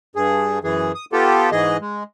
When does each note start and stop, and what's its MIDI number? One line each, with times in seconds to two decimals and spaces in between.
0.16 0.59 43
0.16 0.59 68
0.64 0.92 42
0.64 0.92 52
0.64 0.92 68
0.95 1.05 87
1.12 1.50 59
1.12 1.50 65
1.12 1.50 67
1.12 1.50 69
1.52 1.77 44
1.52 1.77 52
1.52 1.77 68
1.52 1.77 75
1.81 2.03 56